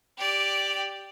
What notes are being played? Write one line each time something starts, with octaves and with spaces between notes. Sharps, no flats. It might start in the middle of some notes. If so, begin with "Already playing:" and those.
G4 D5